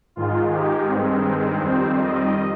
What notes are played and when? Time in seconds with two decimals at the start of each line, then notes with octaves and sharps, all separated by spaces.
0.16 G#2 D#3 G#3 F4
0.52 G4
0.88 G2 D#3 G#3 C4
1.59 F2 D#3 G3 C4 C5
1.95 D#5